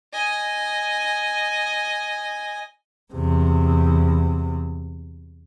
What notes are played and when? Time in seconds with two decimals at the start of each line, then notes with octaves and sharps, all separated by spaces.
0.13 D#5 G#5
3.13 E2 C3